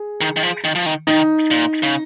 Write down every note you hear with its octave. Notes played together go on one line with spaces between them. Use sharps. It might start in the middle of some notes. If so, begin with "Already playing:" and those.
Already playing: G#4
D#3
D#3
F3
D#3
F3
D#3
D#3 D#4
A#2
C#3